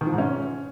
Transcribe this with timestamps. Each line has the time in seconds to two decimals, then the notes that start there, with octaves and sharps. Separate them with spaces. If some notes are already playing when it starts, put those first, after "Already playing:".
0.01 D#3
0.07 F3
0.13 G#2
0.18 C#4